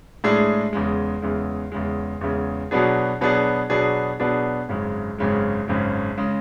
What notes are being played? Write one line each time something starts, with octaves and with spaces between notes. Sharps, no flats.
A2 G#3 D4 G#4
E2 C#3 G#3
E2 C#3 G#3
E2 C#3 G#3
E2 C#3 G#3
B2 F#3 B3 D4 G#4
B2 F#3 B3 D4 G#4
B2 F#3 B3 D4 G#4
B2 F#3 B3 D4 G#4
G#1 F#2 C#3 G#3
G#1 F#2 C#3 G#3
G#1 F#2 C#3 G#3
C#3 G#3